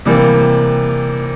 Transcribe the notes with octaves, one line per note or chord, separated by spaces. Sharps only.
C3 E3 G3 A#3